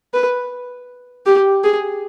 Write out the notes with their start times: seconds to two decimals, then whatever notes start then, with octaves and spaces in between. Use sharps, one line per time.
0.14 B4
1.26 G4
1.64 G#4